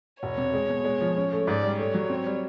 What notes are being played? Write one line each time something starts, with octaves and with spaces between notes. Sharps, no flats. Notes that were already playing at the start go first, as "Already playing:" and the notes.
E1 C#5
C3
G#3
B2
G#3
F3
C#4
A3
G#2 D5
G3
A3 C#5
F#3
C4
G3